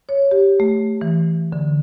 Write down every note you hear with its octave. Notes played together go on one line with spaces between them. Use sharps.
C#5
G4
A3
E3
D3